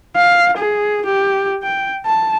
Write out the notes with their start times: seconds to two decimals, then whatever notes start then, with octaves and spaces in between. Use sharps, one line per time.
0.17 F5
0.58 G#4
1.06 G4
1.63 G5
2.06 A5